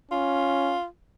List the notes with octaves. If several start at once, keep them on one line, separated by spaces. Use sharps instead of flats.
C#4 F4